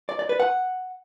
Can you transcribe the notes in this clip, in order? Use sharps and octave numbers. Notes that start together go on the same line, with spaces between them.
D5
D5
B4
F#5